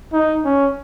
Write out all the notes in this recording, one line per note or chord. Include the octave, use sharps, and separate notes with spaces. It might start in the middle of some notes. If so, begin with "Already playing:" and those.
D#4
C#4